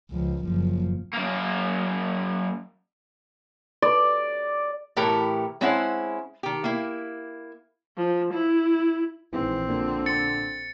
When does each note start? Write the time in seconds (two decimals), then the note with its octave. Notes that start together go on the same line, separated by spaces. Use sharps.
0.11 C#2 F3
0.45 F#1 F3
1.14 F#2 A#3
3.82 D5
4.96 A2 E3 A3 G4 A#4
5.61 G#3 C4 C#4 E4 C5 F#5
6.43 D#3 G4
6.64 A#3 E4
7.97 F3
8.34 E4
9.33 A#1 G#2 E3 C4
9.69 A#2 D3
10.06 A6 C#7